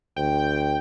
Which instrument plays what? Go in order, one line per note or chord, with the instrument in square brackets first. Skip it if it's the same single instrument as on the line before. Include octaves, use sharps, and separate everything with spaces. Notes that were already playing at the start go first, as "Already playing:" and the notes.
[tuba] D2 [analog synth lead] G5